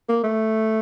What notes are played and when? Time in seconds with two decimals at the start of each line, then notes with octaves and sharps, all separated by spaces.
0.09 A#3
0.24 A3